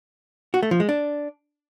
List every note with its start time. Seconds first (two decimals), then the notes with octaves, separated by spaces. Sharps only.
0.54 F#4
0.63 A3
0.71 F3
0.80 G#3
0.89 D4